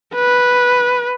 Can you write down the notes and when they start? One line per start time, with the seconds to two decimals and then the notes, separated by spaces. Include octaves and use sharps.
0.14 B4